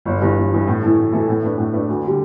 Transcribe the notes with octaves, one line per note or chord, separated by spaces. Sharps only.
G1
G2 E3
G1
G2 E3
A2
E3 A3 E4 A4
A2
E3 A3 E4 A4
A2
A3 D4 B4
A2
A3 D4 B4
D2
D3 G3